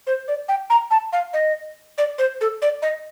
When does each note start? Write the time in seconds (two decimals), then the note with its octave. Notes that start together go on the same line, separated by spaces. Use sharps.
0.07 C5
0.28 D5
0.49 G5
0.70 A#5
0.91 A5
1.13 F5
1.33 D#5
1.98 D5
2.19 C5
2.41 A4
2.62 D5
2.82 D#5